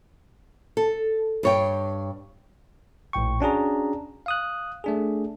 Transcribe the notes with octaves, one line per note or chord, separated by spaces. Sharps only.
A4
G2 C#5 G5
A#1 A2 G5 C#6
C#4 D4 F#4 G#4 A#5
F5 D#6 F#6
A3 D4 G#4